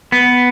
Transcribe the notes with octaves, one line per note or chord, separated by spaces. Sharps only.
B3